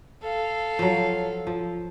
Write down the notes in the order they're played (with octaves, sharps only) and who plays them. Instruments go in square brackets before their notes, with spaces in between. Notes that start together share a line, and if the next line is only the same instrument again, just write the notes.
[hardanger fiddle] A4 F5
[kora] F3 F#3
F3